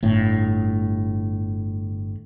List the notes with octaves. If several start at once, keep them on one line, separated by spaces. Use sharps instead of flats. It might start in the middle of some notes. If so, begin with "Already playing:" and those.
G1 A2